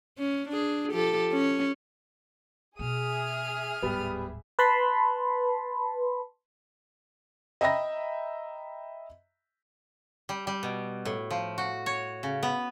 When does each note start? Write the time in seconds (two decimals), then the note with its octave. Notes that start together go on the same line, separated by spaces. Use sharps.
0.18 C#4
0.49 D4 G#4
0.91 F3 G4 A4
1.32 C#4
2.79 B2 B3 G#4 E5 D#6 F6
3.82 D1 G#2 G3 B3
4.59 B4 A5 B5 C6
7.61 D#5 E5 G5 A#5 B5 A#6
10.29 G3
10.47 G3
10.63 B2
11.05 A2
11.31 F3
11.58 F#4
11.86 C#5
12.23 C#3
12.43 B3